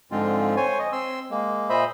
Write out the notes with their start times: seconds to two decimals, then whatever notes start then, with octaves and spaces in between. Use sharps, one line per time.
0.12 G#2 D3 F3 G#3 C4 F4
0.57 C5 C#5 G#5
0.79 D#5
0.92 C4 C6 E6
1.31 G#3 A#3
1.69 A#2 C5 D#5 E5 B5